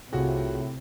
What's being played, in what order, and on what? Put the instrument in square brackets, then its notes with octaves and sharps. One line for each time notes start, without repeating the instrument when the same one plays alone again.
[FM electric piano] C2 F4 G#4 [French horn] A2 [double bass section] C3 [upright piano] F#4